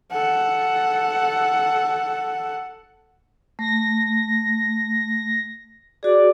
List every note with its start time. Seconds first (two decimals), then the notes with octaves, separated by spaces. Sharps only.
0.12 A4 F#5
3.59 A3 A#6
6.03 F#4 G#4 D5